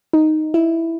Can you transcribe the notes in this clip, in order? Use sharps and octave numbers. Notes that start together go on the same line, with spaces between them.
D#4
E4